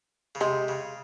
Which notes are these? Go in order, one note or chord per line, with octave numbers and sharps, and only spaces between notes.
C#3
C3 G#3
C#3